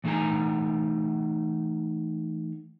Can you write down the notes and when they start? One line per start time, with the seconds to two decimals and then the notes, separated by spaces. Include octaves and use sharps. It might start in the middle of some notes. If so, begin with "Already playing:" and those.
0.04 E3 A3 D#4 G#4 G#5 A#5